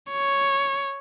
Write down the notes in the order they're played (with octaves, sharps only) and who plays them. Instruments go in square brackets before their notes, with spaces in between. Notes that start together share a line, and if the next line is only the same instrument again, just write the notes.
[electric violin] C#5